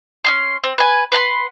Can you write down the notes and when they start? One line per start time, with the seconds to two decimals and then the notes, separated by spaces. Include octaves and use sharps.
0.25 C#4 D#4 C6
0.64 C4
0.78 B4 G#5
1.12 B4 F#5 A#5 C6